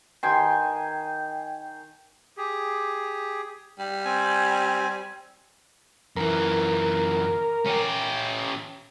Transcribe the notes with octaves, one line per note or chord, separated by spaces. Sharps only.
D#3 G5 G#5 C6
G4 G#4
G3
C4 G#5
F#2 E3 A#4
C#4 G4